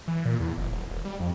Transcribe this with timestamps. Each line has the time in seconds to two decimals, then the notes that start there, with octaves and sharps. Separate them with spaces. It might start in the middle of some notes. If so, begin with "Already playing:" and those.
0.08 E3
0.25 A#2
0.40 E2
0.58 F#1
0.71 D#1
0.90 D#1
1.05 G3
1.20 F2